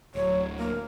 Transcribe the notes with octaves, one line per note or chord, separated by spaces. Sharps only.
D1 F#3 C#5
A#3 A#4